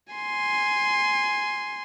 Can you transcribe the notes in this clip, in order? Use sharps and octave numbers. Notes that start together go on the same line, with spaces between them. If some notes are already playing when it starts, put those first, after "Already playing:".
G#5 C6